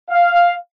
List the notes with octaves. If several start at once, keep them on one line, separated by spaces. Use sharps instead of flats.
F5